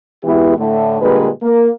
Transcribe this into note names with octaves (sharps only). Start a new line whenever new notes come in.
B2 E3 G#3 B3 E4 G4
A2 D3 A3
A#2 D3 G3 G#3 B4
A#3